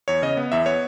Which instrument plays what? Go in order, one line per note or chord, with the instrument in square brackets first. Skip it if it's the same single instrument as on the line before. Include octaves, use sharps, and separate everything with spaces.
[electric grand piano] E2 C#5
C#3 D#5
B3
E2 E5
B3 C#5